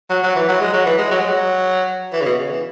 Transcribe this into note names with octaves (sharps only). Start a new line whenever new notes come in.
F#3
F#3
E3
F#3
G#3
F#3
E3
G#3
F#3
G#3
F#3
E3
C#3
B2
C#3
E3